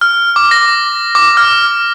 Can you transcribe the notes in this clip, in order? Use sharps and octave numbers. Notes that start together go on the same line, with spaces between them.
F6
D6
A#6
D6
F6